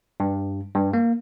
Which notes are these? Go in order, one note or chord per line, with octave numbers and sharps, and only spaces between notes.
G2
G2
A#3